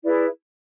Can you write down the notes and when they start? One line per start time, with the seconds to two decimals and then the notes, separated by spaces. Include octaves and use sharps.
0.04 E4 G#4 B4 D5